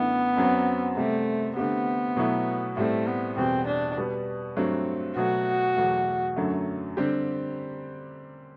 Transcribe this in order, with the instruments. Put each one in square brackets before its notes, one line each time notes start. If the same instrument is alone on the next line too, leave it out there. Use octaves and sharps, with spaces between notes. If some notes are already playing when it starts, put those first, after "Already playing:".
Already playing: [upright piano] F#2 D3 A3 E4 [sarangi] B3
[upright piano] F#2 F#3 C4
[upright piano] C3 G3 C4 G4 [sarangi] A3
[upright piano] D3 A3 C4 G4 [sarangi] B3
[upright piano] B2 F#3 A3 E4
[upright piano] A2 G3 C4 [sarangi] A3
[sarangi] B3
[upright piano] E2 B2 G3 [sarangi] C4
[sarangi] D4
[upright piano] B2 G3 B3
G2 F#3 A3 C4
[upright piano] B2 F#3 A3 [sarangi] F#4
[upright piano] E2 B2 F#3 A3
F#2 D3 F#3 A3
D3 G3 C4 G4